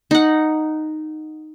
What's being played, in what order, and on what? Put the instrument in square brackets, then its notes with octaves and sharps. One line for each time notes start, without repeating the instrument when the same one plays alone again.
[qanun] D#4 F#5